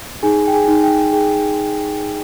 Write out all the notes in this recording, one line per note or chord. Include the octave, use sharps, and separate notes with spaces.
D#4 G#4 G#5
G5
G#4 G#5
D#4
G5
G#4 G5